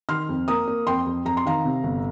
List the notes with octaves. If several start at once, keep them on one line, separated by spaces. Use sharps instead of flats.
D#3 C6 F6
F2
A#3 A#5 D#6
A#3
F2 G5 C6
F2
F2 A#5
C6
D#3 F5 A#5
C3
G1